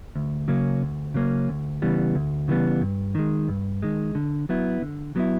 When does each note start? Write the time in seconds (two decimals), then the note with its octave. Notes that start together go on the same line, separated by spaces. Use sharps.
0.15 D2
0.48 C#3 F#3 A#3 C#4
0.82 D2
1.14 C#3 F#3 A#3 C#4
1.49 D2
1.82 C#3 E3 G3 B3
2.15 D2
2.48 C#3 E3 G3 B3
2.81 G2
3.15 D#3 G#3
3.48 G2
3.82 D#3 G#3
4.15 D3
4.49 F#3 B3 E4
4.82 D3
5.16 F#3 B3 E4